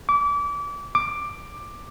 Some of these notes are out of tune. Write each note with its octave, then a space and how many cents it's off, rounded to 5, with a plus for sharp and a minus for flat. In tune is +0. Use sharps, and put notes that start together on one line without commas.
D6 -30
D6 +10